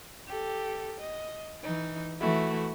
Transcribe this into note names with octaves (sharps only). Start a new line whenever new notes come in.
G4 A4
D#5
E3 D#4
E3 A3 E4 F#4